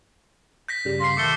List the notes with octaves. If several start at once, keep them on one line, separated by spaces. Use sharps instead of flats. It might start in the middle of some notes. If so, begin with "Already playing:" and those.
G6 A#6 B6
G2 C#3 G3
F5 C6 A#6 C7
B2 D#3 A3 D6 C#7 G7